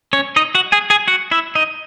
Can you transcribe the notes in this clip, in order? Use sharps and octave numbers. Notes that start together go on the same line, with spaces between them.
C#4 C#5
D#4 D#5
F#4 F#5
G#4 G#5
G#4 G#5
F#4 F#5
E4 E5
D#4 D#5